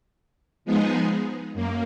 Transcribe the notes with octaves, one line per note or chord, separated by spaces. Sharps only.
F3 G#3 B3 D#4 G#4
F#2 A#3